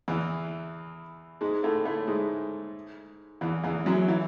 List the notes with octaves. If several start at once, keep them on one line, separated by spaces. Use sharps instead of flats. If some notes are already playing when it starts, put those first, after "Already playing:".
E2 E3
G#2 G#3
A2 A3
A2 A3
G#2 G#3
E2 E3
E2 E3
F#2 F#3
E3